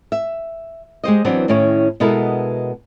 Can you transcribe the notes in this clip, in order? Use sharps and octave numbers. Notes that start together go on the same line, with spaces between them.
E5
G#3 G4 C5 D#5
E3 F#3 B3 C4 D4
A2 D#3 C#4 E4 C#5
B2 G#3 B3 E4 A4 A#4